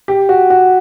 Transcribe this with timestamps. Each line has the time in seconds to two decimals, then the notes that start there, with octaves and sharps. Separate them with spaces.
0.08 G4
0.29 F#4
0.50 F#4